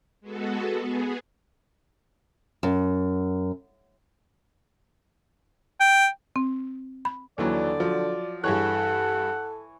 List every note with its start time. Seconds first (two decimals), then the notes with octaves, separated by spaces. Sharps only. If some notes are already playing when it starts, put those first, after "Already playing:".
0.21 G#3 B3 F#4 A4
0.79 B3 G#4
2.63 F#2
5.80 G5
6.36 C4
7.05 B5
7.38 D#2 D3 E3 F#3 D5
7.80 F3 F#3
8.44 G2 E3 G#4 A4 C#5 F#5 F#6